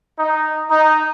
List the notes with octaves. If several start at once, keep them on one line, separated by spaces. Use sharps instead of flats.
D#4
D#4